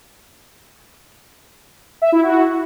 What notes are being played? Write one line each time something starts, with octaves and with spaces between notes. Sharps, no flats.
E5
E4
F#4